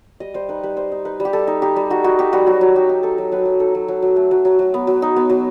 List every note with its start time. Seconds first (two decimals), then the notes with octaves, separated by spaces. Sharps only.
0.20 G3 D#5
0.34 G3 C5
0.49 D#4 B4
0.63 G3 B4
0.76 G3 C5
0.92 D#4
1.05 D#4 B4
1.20 G3
1.25 G4
1.33 G3 A4
1.47 D#4
1.62 D#4 G4
1.76 G3
1.90 D#4 F#4
2.04 D#4 F#4
2.19 D#4 G4
2.33 G3 F#4
2.47 F#3 F#4
2.61 F#3
2.76 D#4 G4
2.89 D#4
3.03 D#4 A4
3.18 F#3
3.32 F#3 B4
3.45 F#3
3.60 D#4 A4
3.75 F#3
3.88 F#3
4.02 F#3
4.16 A3
4.31 F#3
4.45 F#3
4.59 F#3
4.74 B3
4.87 F#3
5.02 D#4
5.16 B3
5.30 F#3